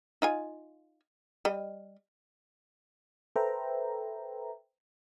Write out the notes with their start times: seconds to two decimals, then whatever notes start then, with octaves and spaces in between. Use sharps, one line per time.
0.22 D#4 F4 G#5
1.45 G3 D#5
3.36 A4 B4 C5 E5 G5 A#5